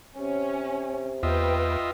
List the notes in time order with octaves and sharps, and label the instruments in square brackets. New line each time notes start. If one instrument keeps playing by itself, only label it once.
[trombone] C3 [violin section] C#4
[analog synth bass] E2 [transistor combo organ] F4 D#5 E5 [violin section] B4 G5